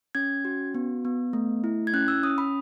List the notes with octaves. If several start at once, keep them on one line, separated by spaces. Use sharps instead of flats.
C#4 G#6
F#4
B3
B3
A3
E4
G#6
C#4 F#6
E6
C#4 D#6
B5